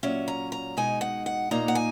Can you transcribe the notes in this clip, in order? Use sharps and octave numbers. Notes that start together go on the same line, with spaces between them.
A#2 F#3 C#4 E5
A#5
A#5
B2 G#3 D#4 G#5
F#5
F#5
A#2 A#3 D#4 A#5
F#5
G#5